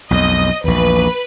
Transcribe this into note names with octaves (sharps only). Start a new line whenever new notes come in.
B1 F2 D#5
A#1 E2 B4